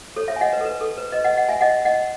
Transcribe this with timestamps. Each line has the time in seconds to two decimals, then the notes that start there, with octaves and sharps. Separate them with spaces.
0.16 A4 C#5
0.28 C#5 E5
0.36 G#5
0.41 D#5 F#5
0.52 B4 D#5
0.61 A4
0.65 B4
0.81 A4
0.97 B4
1.12 B4 D#5
1.24 D#5 F#5
1.37 D#5 F#5
1.49 E5 G#5
1.61 D#5 F#5
1.85 D#5 F#5